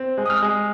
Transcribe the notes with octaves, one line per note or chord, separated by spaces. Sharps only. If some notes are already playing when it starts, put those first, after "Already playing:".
Already playing: C4
G#3
D#6
F6
G#3